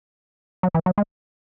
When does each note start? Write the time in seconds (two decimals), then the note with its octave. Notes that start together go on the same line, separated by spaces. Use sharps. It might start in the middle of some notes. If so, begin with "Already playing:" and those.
0.63 F#3
0.74 E3
0.86 F#3
0.98 G#3